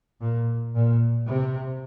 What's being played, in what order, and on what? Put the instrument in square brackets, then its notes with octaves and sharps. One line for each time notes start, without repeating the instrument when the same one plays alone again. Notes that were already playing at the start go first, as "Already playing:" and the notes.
[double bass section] A#2
A#2
C3